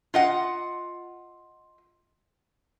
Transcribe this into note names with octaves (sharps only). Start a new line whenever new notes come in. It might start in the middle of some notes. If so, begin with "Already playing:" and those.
F4 D#5 F#5